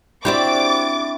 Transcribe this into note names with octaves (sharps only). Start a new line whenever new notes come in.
C4 D4 E4 F#4 G4 C#6 D6 A6